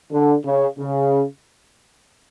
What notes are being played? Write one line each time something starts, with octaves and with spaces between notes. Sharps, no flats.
D3
C#3
C#3